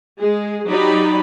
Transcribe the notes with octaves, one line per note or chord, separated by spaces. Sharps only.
G#3 G#4
F#3 D#4 G4 D5 B5